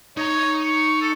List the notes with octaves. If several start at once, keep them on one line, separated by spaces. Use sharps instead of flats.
D#4 C#5 A#5
C#6
A4